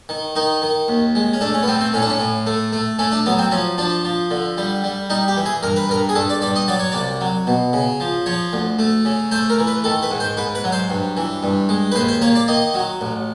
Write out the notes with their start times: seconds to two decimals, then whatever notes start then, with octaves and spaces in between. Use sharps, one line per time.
0.09 D#3
0.35 D#3 D#4
0.62 D#3
0.88 D#2
1.15 G#3
1.33 C#4
1.41 A3 D4
1.54 C#4
1.63 B3
1.68 A3 C4
1.81 C4
1.93 A2 C#4
2.02 D4
2.10 C#4
2.20 A2
2.47 A3
2.72 A3
2.99 A3 C#4
3.12 D4
3.26 F#3 B3
3.39 C4
3.51 F3 C#4
3.78 F3 D4
4.05 F3
4.31 D3
4.58 G3
4.84 G3
5.10 G3 D#4
5.28 G4
5.37 E3
5.46 G#4
5.63 G2 A#4
5.76 B4
5.89 G2 A#4
6.09 G#4
6.15 G2 A4
6.29 D5
6.42 G2 D5
6.56 D#5
6.68 F#3 D5
6.80 C#5
6.92 C2 D5
7.21 F#3
7.47 B2
7.73 C#3
8.00 F3
8.26 F3 C#5
8.53 D2
8.79 A3
9.05 C#3
9.31 A3 C5
9.50 A#4
9.59 E3
9.67 B4
9.84 D#3 A4
10.02 B4
10.11 G#2
10.20 C5
10.37 G#2 B4
10.55 B4
10.64 F#3
10.72 C5
10.90 G2
11.17 E3
11.43 G2
11.69 G#3
11.92 B4
11.95 D#2 C5
12.08 C5
12.22 A#3 C#5
12.35 D5
12.48 D#3 D#5
12.75 F#3
13.01 A1